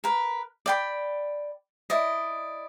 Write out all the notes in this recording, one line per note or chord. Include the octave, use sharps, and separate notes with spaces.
A#4 B4
D5 G5 B5
E4 D5 D#5